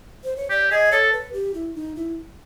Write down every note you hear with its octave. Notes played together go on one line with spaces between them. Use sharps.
C5
C#5
G4 D5
G#4 D#5
A4 C#5
B4
G4
E4
D#4
E4